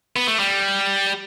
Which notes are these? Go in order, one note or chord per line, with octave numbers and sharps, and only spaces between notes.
B3
A3
G3